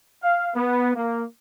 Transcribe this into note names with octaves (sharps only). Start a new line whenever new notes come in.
F5
B3
A#3